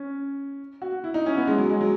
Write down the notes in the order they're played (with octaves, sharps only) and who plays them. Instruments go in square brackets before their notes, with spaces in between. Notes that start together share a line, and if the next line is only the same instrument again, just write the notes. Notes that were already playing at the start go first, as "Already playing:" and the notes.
Already playing: [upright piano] C#4
F#4
E4
D#4
C#4
B3
G#3
F#3
G#3
F#3